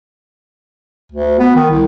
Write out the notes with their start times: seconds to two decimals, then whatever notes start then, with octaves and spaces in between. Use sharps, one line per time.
1.12 D2
1.39 B3
1.55 D#3
1.71 C2